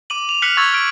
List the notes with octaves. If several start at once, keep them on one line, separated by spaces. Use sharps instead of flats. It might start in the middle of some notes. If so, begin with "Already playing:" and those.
D6 D#7 F#7
F7
F6 F#6 B6 C#7 F7 F#7
C#6 E6 G#6 A6 B6
F6 D7